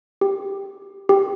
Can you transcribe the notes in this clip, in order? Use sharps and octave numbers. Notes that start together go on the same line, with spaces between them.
G4
G4